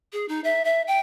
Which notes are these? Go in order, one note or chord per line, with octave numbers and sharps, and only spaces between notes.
G#4
D#4
E5
E5
G5